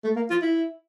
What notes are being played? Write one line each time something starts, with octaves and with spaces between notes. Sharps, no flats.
A3
A#3
F4
E4